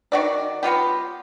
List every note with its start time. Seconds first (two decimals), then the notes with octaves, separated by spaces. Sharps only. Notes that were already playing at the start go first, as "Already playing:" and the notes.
0.12 D#3 F#4 D5
0.63 F#3 B3 F4 G4